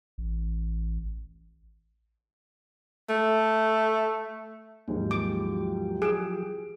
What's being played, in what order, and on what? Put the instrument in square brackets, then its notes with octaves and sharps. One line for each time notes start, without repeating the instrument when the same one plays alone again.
[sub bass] A1
[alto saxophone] A3
[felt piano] D#2 G#2 [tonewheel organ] F3 F#3 G4
[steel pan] D6
[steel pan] G#4 [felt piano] D7 E7